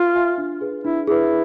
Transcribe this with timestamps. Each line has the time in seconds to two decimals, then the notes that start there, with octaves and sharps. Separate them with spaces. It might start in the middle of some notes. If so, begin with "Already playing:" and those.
Already playing: F4 B4 E5 G#5 C6
0.15 E5 G#5 C6
0.38 D4
0.61 G#4 B4
0.84 D4 E4
1.07 E4 G#4 B4